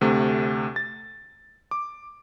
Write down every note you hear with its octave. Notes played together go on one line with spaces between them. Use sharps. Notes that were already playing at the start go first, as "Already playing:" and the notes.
D2 C3 A3
A6
D6